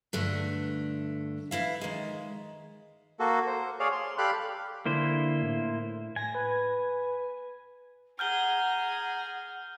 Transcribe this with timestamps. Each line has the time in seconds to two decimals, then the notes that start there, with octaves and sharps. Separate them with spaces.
0.13 G2 D3 A3
1.51 E3 E4 F5
1.81 D#3 G#3
3.19 A#3 F#4 A4
3.47 C5
3.80 G#4 C#5 D5 F5
3.92 C6
4.18 G4 A4 D5 F5 B5 F#6
4.86 D3 A#3 E4 C5
5.43 A2
6.16 G#5 A#6
6.35 B4
8.19 G#4 F#5 A#5 F6 G6 G7